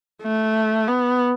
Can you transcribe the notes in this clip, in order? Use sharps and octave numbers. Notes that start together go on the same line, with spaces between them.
A3
B3